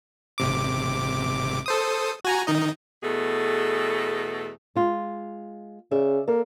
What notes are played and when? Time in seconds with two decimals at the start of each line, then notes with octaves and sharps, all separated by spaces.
0.38 G#1 C3 D6
1.66 A4 C5 D#6
2.25 F#4 G#5 A#5
2.47 D#3 D#4 D#5
3.03 E2 B2 A3 G#4 A4
4.76 G#3 F4
5.91 C#3 D5 E5
6.28 A#3 A4